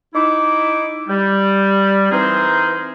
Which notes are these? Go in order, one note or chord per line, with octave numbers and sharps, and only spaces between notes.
D#4 E4 D6
G3
E3 C4 D#4 G#4 A#4 C5